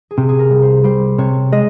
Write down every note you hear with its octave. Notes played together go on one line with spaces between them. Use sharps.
G#4
C3 G4
G#4
A#4
C2
C5
G3 C5
C3 C#5
G#3 D#5